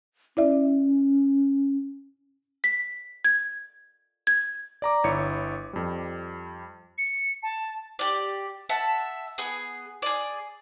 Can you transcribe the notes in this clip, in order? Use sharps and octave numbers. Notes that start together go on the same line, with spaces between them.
C#4 E4 D5 E5
B6
G#6
G#6
D5 A#5 D6
G1 E4 C#5 C#7
F2 G3
C#7
A5
G4 D5
E5 F#5 A5
B3 G#4
G#4 D5